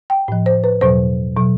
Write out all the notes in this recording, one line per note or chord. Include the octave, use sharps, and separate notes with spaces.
G5
A2 F3
C5
B4
E2 B2 F#3 C5
B2 F#3